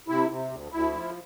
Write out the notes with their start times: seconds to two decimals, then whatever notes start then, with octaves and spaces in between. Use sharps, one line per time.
0.08 C3 E4
0.29 C3
0.51 D2
0.72 D2 E4
0.93 F3